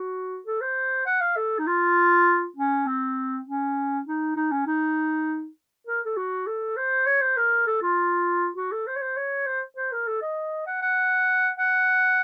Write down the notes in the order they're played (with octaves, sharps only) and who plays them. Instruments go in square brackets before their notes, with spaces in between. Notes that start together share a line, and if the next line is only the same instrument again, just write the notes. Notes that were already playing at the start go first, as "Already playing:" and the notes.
Already playing: [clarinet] F#4
A4
C5
F#5
F5
A4
D#4
F4
C#4
C4
C#4
D#4
D#4
C#4
D#4
A#4
A4
F#4
A4
C5
C#5
C5
A#4
A4
F4
F#4
A4
C5
C#5
C5
C#5
C5
C5
A#4
A4
D#5
F#5
F#5
F#5